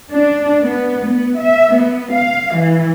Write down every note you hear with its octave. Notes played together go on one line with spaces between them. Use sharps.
D4
B3
B3
E5
B3
F5
E3